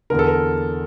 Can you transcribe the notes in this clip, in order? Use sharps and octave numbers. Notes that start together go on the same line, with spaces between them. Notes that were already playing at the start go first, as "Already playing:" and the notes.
E2 D3 A#4
A4
A#4